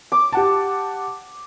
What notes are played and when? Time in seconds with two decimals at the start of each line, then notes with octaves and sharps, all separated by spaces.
0.12 D6
0.32 G4 F#5 A5